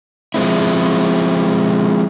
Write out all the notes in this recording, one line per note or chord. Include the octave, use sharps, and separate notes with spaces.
F3 G#3 C4 E4